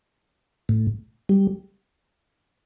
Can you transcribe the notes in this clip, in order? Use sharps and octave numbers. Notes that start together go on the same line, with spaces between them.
A2
G3